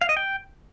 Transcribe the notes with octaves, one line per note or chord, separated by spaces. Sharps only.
F5
D#5
G5